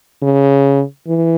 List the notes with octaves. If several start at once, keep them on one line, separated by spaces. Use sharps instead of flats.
C#3
E3